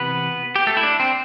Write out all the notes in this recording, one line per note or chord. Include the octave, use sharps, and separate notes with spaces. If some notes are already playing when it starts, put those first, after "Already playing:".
Already playing: C3 E3 B3 B4
G4
A3 A4
E4
D4
C4